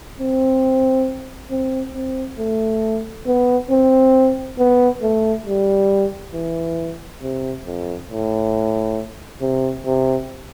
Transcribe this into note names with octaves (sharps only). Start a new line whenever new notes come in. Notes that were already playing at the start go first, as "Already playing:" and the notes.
C4
C4
C4
A3
B3
C4
B3
A3
G3
E3
C3
F2
A2
C3
C3